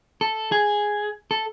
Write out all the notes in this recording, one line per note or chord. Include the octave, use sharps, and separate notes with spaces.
A4
G#4
A4